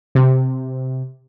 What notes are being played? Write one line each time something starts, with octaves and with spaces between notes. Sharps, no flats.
C3